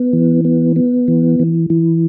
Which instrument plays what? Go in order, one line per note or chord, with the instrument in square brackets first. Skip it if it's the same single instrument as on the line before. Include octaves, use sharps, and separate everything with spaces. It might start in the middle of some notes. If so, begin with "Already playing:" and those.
Already playing: [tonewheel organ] B3
E3
B3
B3
E3
E3
E3